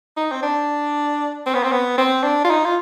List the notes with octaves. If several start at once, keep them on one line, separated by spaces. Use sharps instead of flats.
D#4
C4
D4
C4
B3
C4
B3
C4
D4
F4
D#4
F4